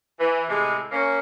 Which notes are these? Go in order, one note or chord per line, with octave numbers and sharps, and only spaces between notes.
E3
A2 C3 G#3
A#3 C#4